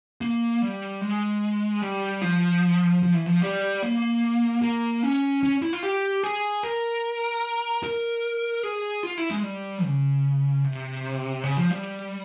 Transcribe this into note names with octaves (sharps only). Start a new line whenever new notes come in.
A#3
G3
G#3
G3
F3
F3
E3
F3
G3
A#3
A#3
C#4
C#4
E4
F4
G4
G#4
A#4
A#4
G#4
F4
E4
G#3
G3
C#3
C3
C#3
F3
G3